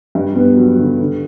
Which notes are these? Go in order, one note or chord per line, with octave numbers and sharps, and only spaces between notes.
G2
B3
F#3
D3
D3